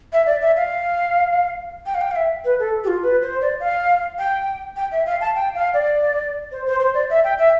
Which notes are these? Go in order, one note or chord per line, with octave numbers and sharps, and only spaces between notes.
E5
D5
E5
F5
G5
F5
G5
F5
E5
B4
A4
G4
F4
B4
C5
D5
F5
G5
G5
E5
F5
A5
G5
F5
D5
C5
C5
C5
D5
E5
G5
E5